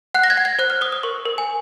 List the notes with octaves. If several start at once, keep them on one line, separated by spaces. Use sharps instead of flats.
F#5 F#6
A#6
G#6
F#5
G#6
C5 F#6
F6
C5 D#6
D#6
A#4 C#6
A#4
G#5